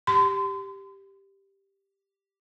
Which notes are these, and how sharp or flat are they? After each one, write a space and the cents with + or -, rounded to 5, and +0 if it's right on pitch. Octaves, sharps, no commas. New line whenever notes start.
G4 +0 C6 -35